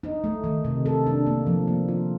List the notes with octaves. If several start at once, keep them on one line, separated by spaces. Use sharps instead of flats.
D#4
A3
D#3
C3
A4
D4
A#3
F3
A#3
F4